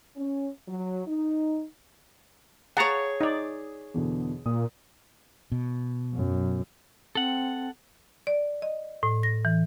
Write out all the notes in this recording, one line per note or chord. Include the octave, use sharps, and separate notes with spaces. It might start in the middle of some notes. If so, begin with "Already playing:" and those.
C#4
F#3
D#4
G#4 C#5 F5 F#5 A5 A#5
D#4 D5 D#6
E2 B2 D3
A#2 D#6
B2
F#2
C4 A4 F#5
D5
D#5
A2
A#6
E3